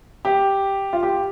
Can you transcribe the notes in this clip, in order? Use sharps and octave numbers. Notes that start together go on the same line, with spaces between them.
G4
F4
G4